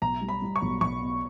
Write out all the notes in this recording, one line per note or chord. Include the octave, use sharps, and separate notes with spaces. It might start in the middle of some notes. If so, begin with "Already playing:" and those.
B1 A#5
G3
B5
G3
C#6
B1
B1 C#6
B2